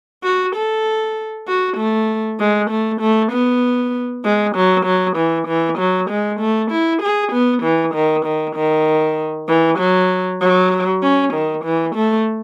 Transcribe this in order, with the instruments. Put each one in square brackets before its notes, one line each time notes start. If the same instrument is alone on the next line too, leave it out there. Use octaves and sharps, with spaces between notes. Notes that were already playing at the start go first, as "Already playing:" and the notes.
[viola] F#4
A4
F#4
A3
G#3
A3
A3
B3
G#3
F#3
F#3
E3
E3
F#3
G#3
A3
E4
G#4
B3
E3
D#3
D#3
D#3
E3
F#3
F#3
C#4
D#3
E3
A3